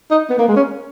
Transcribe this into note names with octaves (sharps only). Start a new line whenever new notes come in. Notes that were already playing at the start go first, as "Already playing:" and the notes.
D#4
B3
A#3
G#3
C#4